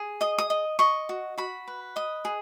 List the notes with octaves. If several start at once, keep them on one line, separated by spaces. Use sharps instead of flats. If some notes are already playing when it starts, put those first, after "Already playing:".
Already playing: G#4
D#5 D#6
D#6
D#5
D#5 C#6
F#4
F#4 B5
B4
D#5 D#6
G#4